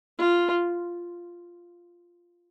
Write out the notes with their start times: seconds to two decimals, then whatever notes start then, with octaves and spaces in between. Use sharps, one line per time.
0.18 F4